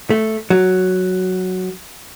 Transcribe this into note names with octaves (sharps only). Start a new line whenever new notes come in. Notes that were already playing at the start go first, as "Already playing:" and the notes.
A3
F#3